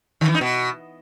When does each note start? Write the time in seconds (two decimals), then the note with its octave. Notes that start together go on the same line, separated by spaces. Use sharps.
0.21 D#3
0.28 E3
0.34 D#4
0.41 B2